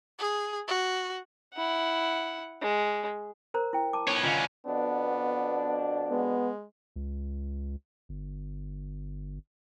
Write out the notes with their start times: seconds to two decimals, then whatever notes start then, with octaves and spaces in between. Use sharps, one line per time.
0.19 G#4
0.68 F#4
1.54 E4 F#5
2.62 G#3
3.54 A#4 C5 A#5
3.73 E4 G5
3.93 A5 D6
4.08 B3 C#5
4.23 D3 C#4 F4 D#5 F5
4.66 F2 B2 B3 D4
6.10 G#3 B3
6.96 C#2
8.09 G1